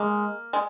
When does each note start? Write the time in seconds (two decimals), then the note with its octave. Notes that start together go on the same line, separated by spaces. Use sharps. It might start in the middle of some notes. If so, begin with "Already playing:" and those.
Already playing: G#3 A#3
0.53 G#3